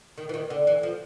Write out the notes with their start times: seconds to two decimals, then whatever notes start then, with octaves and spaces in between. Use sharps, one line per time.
0.18 D#3
0.29 E3
0.34 D#3
0.50 D3
0.67 E3
0.83 F3